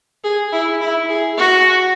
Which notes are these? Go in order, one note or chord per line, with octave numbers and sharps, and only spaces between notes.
G#4
E4
E4
G#4
F#4